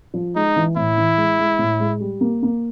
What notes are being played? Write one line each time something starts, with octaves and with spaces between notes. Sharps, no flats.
F3
G#3 D#4
E3
A2 E4
E3
G#3
G#3
A2
G#3
G3
A#3
A#3